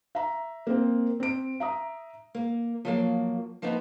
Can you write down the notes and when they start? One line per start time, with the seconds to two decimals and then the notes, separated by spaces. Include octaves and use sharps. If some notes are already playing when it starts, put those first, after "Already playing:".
0.15 E5 A#5
0.67 A#3 C4
1.20 C4 D7
1.60 E5 A#5 D#6
2.35 A#3
2.85 F3 F#3 A#3
3.62 F3 A#3 B3 D#4